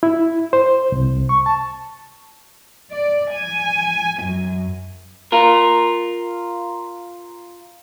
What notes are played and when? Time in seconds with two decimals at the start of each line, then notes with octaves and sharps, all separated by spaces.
0.03 E4
0.53 C5
0.92 C2
1.29 C#6
1.46 A5
2.90 D5
3.31 G#5
4.21 F#2
5.32 F4 A#4